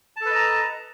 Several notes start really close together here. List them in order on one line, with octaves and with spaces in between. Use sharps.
A5 A4 B4 D#5 A#5